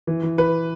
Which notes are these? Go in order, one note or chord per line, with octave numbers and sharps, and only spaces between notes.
E3
E3
E3 B4